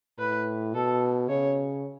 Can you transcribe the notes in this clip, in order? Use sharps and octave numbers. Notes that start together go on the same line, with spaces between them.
A2 B4
B2 A4
C#3 C#5